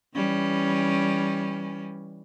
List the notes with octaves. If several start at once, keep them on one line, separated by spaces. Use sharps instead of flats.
E3 G3 C#4